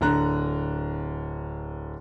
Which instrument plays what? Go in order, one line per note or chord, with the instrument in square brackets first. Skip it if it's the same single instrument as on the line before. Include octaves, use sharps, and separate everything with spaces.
[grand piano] D1 D3 A#5 F#6